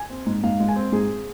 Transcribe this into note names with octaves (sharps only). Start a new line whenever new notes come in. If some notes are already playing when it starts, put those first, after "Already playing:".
Already playing: G#5
C4
G#2
G#2 F5
G#3
G#5
C4
G#2 G#4